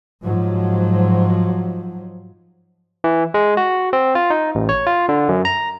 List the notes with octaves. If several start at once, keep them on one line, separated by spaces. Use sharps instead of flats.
G#2 F3 F#3
E3
G#3
F#4
C4
F4
D#4
A1
C#5
F4
D3
F#2
A#5